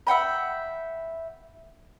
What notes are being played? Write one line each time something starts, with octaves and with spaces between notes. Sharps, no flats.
E5 F#5 G5 B5